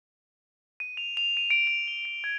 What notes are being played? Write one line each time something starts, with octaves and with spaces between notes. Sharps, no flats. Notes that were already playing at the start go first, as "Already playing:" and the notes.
D#7
F7
F7
D#7
D7
F7
G7
D7
G#6